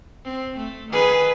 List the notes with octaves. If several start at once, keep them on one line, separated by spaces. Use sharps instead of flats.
C4
A3
D#3 G#4 B4